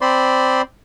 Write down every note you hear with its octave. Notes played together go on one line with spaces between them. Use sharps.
C4 C5 D5 B5 C6